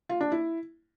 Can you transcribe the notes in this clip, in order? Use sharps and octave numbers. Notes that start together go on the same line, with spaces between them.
F4
D4
E4